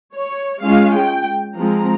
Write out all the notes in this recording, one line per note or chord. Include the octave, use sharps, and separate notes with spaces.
C#5
G#3 C#4 F4 F5
G5
F3 G#3 C4 A#5